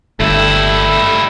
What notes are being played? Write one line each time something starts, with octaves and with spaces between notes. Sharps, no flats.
G1 G2 A3 E4